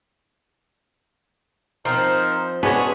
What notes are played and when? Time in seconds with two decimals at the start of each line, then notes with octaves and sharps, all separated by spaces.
1.85 F3 C4 D#4 A#4
2.63 G#3 B3 C#4 D4 F#4 G#4 B4 C#6